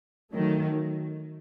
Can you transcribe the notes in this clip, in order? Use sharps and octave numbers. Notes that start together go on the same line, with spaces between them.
D#3 F#3 A3